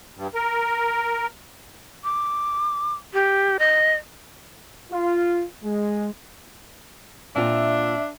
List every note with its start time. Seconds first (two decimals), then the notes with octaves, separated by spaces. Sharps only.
0.16 G2
0.35 A#4
2.04 D6
3.14 G4
3.59 D#5
4.91 F4
5.63 G#3
7.36 A#2 C4 D4 F4 E5